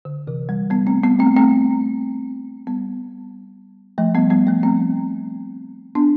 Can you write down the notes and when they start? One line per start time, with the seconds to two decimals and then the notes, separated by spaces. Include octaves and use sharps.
0.05 D3
0.27 C3 E3
0.49 E3 G3
0.70 G3 B3
0.87 A3 C4
1.03 G3 B3
1.19 A3 C4
1.36 A3 C4
2.67 G3 B3
3.98 F3 A3
4.15 G3 B3
4.30 G3 B3
4.47 F3 A3
4.63 A3 C4
5.95 B3 D4